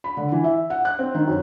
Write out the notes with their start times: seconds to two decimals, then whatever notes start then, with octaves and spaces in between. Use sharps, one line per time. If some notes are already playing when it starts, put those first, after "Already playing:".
0.04 B5
0.17 D3
0.32 E3
0.44 E5
0.70 F#5
0.85 F#6
0.99 C4
1.15 D#3
1.28 F#2